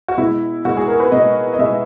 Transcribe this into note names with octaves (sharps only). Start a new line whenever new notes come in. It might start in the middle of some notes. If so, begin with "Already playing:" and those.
F#4
B2 G#3 E4
B2 G#3 F#4
G#4
A#4
B4
B2 G#3 D#5
D#5
B2 G#3 E5